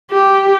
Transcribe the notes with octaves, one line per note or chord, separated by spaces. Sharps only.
G4